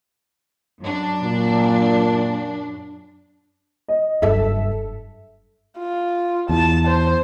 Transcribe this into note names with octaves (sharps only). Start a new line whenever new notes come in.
F#2 D4
A#2
D#5
F#1 G2 A4 E5
F4
E2 A5
C5